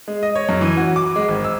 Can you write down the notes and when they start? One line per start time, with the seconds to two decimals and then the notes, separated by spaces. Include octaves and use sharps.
0.08 G#3
0.23 D#5
0.35 C#5
0.49 F#2
0.61 E3
0.77 F#4
0.96 D6
1.16 G#3
1.28 G#1
1.44 E6